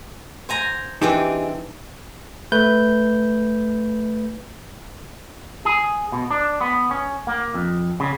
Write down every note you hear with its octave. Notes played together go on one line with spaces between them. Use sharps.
C5 G#5 A#5
E3 C4 D4 D#4 G4 G#4
A3 B4 G6
G#4
B2
D4
B3
C#4
A#3
F2
C#3